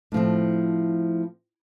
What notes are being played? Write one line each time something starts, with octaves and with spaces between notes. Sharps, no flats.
A2 F3 C4